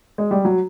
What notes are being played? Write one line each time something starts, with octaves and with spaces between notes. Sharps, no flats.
G#3
G3
F#3